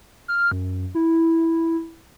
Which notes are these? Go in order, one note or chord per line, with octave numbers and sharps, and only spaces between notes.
F6
F#2
E4